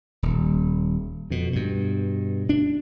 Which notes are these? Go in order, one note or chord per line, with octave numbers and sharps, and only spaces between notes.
D#1
F2 B2
G2 B2
D4